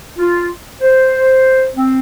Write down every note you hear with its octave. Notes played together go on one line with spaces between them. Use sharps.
F4
C5
C4